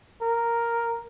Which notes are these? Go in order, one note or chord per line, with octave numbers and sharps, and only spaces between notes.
A#4